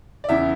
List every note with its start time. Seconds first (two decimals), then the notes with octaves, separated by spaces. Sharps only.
0.24 D5
0.29 E2 C#3 E3 E5